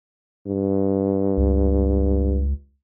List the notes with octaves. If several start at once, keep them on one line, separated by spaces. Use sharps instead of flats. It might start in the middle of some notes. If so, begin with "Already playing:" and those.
G2
C#2